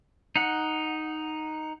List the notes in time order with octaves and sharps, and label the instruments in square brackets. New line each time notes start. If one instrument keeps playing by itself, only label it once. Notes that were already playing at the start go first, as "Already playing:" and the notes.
[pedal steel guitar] D#4 F#5